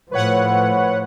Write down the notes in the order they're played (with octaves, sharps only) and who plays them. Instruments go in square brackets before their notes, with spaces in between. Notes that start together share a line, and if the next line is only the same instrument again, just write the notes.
[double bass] A2 F3 [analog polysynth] B4 C#5 F#5